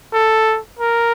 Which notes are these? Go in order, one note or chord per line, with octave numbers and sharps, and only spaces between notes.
A4
A#4